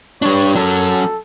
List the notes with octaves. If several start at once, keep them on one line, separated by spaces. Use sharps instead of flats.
G3 D4 C#5
F#3 C#4 A4